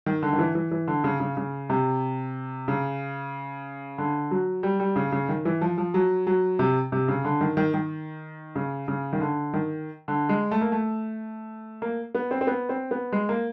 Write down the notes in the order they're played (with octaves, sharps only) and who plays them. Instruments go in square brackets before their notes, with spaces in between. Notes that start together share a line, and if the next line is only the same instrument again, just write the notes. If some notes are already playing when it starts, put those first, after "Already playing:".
[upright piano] D#3
D3
D#3
E3
E3
E3
D3
C#3
C#3
C#3
C3
C#3
D3
F#3
G3
G3
C#3
C#3
D#3
E3
F3
F3
F#3
F#3
C3
C3
C#3
D3
D#3
D#3
D#3
C#3
C#3
D#3
D3
D#3
D3
G#3
A3
A#3
A3
A#3
B3
C4
C4
B3
C4
B3
G#3
A#3